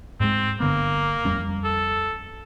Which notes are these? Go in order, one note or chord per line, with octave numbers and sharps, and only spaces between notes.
G#2 G#3 C4
G1 D3 A#3 B3
F2 G3 C#4
A4